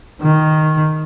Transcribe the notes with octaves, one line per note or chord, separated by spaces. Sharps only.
D#3